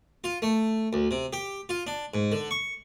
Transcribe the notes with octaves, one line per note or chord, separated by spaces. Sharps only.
F4
A3
D2
C3
G4
F4
D4
G#2
D3
C#6